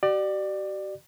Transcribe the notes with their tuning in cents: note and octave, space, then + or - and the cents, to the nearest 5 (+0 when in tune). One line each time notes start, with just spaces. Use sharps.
G4 -45 D5 +25